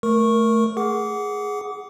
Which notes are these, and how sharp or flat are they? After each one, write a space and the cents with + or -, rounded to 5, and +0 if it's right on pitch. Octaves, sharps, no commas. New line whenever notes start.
A3 +0 A#4 +5 C#6 -15
G#4 +0 F#5 +0 D6 -25